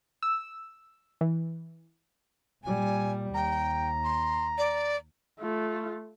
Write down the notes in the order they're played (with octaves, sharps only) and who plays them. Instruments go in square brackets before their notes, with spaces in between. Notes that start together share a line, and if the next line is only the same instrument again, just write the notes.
[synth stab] E6
E3
[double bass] A#2 G3 [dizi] G#5
[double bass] D#2 [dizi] G5 [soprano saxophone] A#5
[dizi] C6
D5
[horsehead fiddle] A3 F4